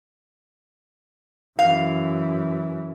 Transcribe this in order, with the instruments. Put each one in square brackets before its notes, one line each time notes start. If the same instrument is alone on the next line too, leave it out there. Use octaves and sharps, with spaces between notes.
[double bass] F#2 E3 [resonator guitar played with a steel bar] F5